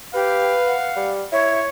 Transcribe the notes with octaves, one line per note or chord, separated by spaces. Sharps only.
G4 B4 F5
F#5
G3
E4 C#5